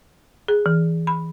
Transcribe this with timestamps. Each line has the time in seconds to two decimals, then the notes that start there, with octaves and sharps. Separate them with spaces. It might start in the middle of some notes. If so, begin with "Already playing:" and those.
0.48 G#4
0.66 E3
1.07 B5